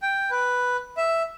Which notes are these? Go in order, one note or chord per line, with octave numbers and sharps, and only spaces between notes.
G5
B4
E5